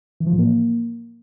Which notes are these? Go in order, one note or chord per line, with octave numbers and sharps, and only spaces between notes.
E3
F3
A2
A#3